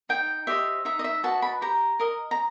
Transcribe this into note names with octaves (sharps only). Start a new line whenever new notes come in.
D#4 G5
G4 C5 D#5 E5
D#4 E5
D#5
E5
F#4 B4 D#5 A5
B5
G4 A#5
A#4 D#5
A#5